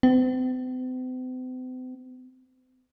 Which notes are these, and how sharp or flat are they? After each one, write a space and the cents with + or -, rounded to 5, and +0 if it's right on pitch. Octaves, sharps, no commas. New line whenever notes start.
C4 -45